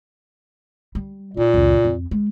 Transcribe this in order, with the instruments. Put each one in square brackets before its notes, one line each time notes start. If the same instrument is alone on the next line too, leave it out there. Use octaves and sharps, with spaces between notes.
[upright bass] G3
[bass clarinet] A#2 [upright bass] D#4
[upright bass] C#2 F#2
F2
G#3